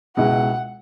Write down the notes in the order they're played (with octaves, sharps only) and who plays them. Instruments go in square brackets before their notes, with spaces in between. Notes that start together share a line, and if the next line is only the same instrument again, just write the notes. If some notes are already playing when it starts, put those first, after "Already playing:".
[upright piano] C#2 B2 G#3 E4 [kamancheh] F#5